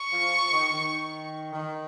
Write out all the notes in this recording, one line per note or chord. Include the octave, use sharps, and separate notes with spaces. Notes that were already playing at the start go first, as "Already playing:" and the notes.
Already playing: C#6
F3
D#3
D#3
D#3